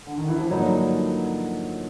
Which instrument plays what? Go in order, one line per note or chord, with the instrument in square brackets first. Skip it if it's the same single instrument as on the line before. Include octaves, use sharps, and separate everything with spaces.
[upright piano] D3
D#3
E3
F3
[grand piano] G2 D3 F3 A#3 D#4 [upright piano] F#3